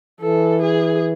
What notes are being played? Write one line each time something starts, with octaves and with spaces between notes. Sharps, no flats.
E3 A4
G#4